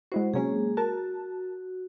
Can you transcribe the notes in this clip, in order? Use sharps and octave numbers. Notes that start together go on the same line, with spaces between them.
G#3 E4 F#4 C5
C3 F#3 G#3 A#3 C#4 G#4
F#4 A#4 A5